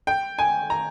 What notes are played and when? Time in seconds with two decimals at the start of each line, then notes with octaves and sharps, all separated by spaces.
0.07 G5
0.39 G#5
0.70 A#5